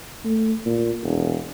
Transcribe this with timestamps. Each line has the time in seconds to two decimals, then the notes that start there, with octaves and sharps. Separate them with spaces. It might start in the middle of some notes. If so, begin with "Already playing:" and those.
0.25 A3
0.66 A#2
1.03 E1